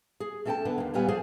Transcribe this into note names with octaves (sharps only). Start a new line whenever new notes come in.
G#4
A3 C#4 A4 D#5 G5 A5
D3 B3
D#2 A#3
D#2 A#2 G3 B3 F5 G#5
F3 A3 G#4 C5 F5 G#5